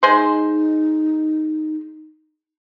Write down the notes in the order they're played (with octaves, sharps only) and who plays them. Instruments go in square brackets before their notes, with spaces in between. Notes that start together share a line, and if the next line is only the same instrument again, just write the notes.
[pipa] G#3 C5 [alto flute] D#4